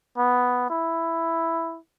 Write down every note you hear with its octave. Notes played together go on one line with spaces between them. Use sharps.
B3
E4